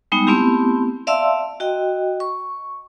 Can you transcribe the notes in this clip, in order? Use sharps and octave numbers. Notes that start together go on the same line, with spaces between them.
G3 G#3 B3 D#4
A3 B3 C4 E4 G4
D5 E5 F5 A5 C6 E6
F#4 D#5 G5
C#6